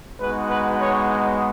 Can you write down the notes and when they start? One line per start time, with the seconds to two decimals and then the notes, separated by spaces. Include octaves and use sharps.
0.20 G#3 B3 D#4 F#4 B4
0.50 B4
0.80 C#5